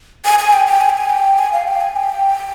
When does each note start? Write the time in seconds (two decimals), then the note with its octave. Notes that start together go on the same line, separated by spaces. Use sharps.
0.25 G#5
0.39 G#5
0.53 G5
0.67 G5
0.81 G#5
0.89 G5
0.97 G#5
1.10 G5
1.39 G#5
1.53 F5
1.68 G5
1.81 G#5
1.96 G5